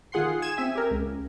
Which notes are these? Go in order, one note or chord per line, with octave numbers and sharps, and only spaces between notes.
D#3 F4 G#4 F#5 C6 C7
G#5 D#6 G#6 E7
C4 E5 G#5
G4 A#4
C#2